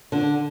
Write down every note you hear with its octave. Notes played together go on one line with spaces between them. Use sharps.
D3